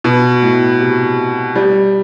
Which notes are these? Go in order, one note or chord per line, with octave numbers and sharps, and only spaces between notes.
B2
A2
C3
G3